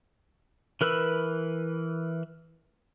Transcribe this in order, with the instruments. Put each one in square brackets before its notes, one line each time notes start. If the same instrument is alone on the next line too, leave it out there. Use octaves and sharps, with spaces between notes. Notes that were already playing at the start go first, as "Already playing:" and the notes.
[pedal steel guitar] E3 A#4 B4 B5 E6